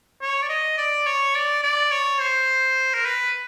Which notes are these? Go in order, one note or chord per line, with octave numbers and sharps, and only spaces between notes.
C#5
D5
D#5
D5
C#5
D5
D5
C#5
C5
A#4
B4